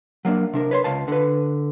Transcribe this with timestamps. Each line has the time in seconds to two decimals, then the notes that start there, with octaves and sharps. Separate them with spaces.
0.25 F#3 A#3 C4 D4
0.53 C3 D4 A#4
0.71 B4 C#5 C6
0.84 C#2 F5 G5 A5
1.08 D3 B4